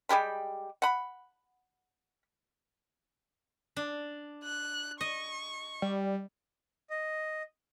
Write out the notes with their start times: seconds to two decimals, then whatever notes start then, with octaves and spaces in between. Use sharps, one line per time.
0.09 G3 G#3 G4 B5
0.82 F#5 B5
3.76 D4
4.44 F#6
5.01 D#5 C#6
5.82 G3
6.90 D#5